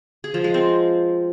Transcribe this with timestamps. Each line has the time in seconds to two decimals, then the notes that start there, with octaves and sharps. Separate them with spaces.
0.24 G#4
0.34 F3
0.44 G#3
0.54 C4